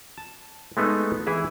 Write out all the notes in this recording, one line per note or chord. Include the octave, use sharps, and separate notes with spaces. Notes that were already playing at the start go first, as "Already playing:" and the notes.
A5
G#3 A3 B3 D#4
E3 E4 G#4 E5